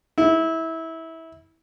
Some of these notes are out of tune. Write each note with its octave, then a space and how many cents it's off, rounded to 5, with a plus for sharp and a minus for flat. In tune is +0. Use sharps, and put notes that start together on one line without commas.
E4 -20